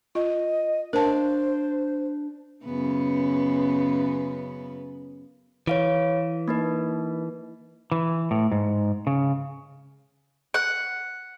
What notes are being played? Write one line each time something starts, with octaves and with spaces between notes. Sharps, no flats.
F4 D#5
D4 A#4 C5 F5 A5
F#2 C#3 B3
E3 C#5 F5 D7
A#3 D#4 B4
E3
A2
G#2
C#3
F#5